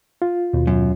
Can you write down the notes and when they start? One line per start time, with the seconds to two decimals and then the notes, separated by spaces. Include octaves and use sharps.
0.22 F4
0.53 D#2 B2
0.67 F#2